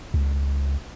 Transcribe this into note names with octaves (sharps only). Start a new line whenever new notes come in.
C#2